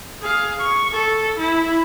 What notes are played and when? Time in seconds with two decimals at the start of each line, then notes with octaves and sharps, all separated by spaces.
0.21 G#4 F5
0.59 C#6
0.92 A4
1.39 E4